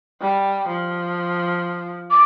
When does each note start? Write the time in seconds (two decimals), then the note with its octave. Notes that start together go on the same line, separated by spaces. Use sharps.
0.21 G3
0.68 F3
2.11 D6